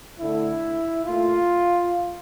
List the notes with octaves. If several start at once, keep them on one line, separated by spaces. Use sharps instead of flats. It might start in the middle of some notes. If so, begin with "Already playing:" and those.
D3 A3 E4
A#2 A3 F4